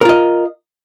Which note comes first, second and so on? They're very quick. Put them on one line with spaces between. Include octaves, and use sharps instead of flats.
A#4 F4 D#5